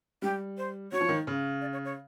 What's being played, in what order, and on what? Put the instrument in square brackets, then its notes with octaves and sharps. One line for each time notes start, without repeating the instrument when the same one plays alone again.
[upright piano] G3 [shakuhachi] G4
[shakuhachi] C5
[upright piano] F#3 [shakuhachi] C#5
[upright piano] F3
D#3
C#3
[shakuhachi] D5
C#5
C#5